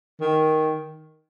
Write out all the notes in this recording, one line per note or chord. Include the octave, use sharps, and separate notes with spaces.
D#3